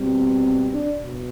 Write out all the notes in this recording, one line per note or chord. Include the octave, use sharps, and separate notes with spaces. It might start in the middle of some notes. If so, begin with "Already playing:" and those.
Already playing: B2 G3 C4
D4
B2